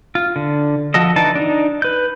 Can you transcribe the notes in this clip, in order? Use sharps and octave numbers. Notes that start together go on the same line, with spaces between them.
F4
D3
F3 F#4 A4 D#5
D3 E3 D#4 A5
D4 D#4
B4 G6